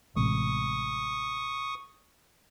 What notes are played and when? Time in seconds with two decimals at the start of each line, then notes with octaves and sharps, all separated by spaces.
0.16 A1 C3 G#3 C#6 D#6